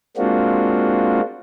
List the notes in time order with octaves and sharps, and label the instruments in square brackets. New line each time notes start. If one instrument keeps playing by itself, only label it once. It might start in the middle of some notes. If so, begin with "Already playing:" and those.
[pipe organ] G#3 A#3 C4 D4 F4 F#4